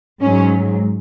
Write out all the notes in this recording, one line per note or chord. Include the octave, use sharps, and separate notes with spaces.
G#2 F#3 C#4